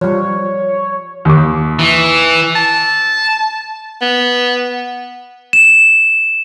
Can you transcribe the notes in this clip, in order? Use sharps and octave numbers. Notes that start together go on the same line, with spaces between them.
F3 G3 C#5
D#2 D6
E3
A5
B3
E7